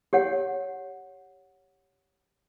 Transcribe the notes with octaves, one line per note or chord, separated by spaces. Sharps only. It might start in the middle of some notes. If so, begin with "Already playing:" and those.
G4 C#5 F#5